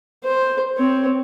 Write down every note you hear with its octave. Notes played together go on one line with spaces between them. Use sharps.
C5
C4 C#5